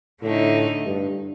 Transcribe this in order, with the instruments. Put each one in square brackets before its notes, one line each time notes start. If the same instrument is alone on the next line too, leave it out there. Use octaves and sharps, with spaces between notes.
[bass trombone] A2 [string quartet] D3 A3 D#4
[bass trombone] G2